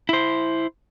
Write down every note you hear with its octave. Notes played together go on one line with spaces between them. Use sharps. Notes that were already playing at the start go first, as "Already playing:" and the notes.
E4 C5